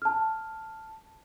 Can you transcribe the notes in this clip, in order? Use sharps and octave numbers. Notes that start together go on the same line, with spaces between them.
A5 F6